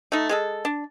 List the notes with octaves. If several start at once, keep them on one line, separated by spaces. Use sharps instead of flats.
A3 D#4
G#3 G#4 A4
D4